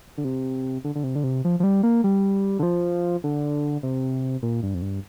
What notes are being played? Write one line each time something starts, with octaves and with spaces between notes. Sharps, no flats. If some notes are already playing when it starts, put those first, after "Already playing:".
D3
C3
D3
D3
C3
D3
C3
F3
F3
G3
A#3
G3
D3
F3
D3
C3
A#2
G2
F2
G2